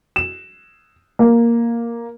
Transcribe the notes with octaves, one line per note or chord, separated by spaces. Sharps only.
E7
A#3